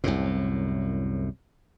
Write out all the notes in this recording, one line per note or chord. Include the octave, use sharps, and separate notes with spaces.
C2 F#2 A2